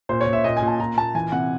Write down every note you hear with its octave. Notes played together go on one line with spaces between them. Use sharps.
A#2 C5
C#5
A#2
E5
A#2 D#5
G#5
A#2
A5
A#2 A#5
A#2 A5
E3 G#5
C3 F#5